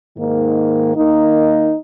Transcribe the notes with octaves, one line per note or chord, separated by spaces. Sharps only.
G#2 D#3 A#3
D#3 A#3 D#4